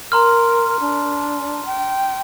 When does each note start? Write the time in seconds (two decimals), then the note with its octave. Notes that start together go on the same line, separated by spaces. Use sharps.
0.12 A#4 A#5 C6 F6
0.80 D4
1.65 G5